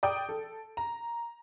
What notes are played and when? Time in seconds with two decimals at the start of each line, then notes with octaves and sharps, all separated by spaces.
0.03 D5 G5 D#6 D7
0.29 A4
0.77 A#5